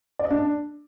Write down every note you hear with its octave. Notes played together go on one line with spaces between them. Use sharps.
D5
D#5
D4